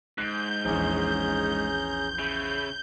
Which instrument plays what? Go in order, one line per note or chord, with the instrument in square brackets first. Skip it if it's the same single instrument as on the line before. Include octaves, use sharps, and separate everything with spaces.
[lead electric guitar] G#2 [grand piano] F#6 C7 D7 [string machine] G6
[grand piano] A#1 E2 [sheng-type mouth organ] C#4 G#4 A#5
[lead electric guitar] C#3 [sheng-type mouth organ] E5 B5